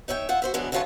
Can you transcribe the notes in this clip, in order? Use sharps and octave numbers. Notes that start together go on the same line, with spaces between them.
D#4 C#5 E5 F#5 G5
F4 E5 F#5
F#4 C5 E5
B2 E3 F#3 G#3 B3 D4
D3 E3 F#3 F4 C#5 A5